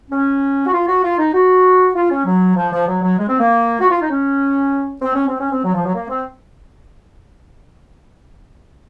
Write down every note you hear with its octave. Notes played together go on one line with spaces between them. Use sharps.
C#4
F#4
F4
F#4
F4
D#4
F#4
F4
C#4
F#3
F3
F3
F#3
F#3
G#3
C4
A#3
F#4
F4
D#4
C#4
C4
C#4
C4
C#4
C4
F#3
F3
F#3
A#3
C4